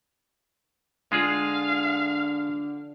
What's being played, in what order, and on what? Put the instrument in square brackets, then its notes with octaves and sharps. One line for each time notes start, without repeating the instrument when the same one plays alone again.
[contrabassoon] D3 [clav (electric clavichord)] G#3 F4 G#4 [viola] F5